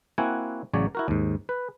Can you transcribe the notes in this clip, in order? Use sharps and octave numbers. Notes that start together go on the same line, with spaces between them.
A#3 C4 E4 F#4 F#5 G#5
A1 C#3 F#3 C#5 D5
E4 F#4 A#4
D#2 G#2
B4